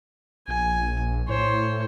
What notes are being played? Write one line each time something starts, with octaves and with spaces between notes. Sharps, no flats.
A#1 G#5
A2 C5 C#5